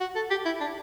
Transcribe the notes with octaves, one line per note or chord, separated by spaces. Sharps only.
F#4
A4
G4
E4
D4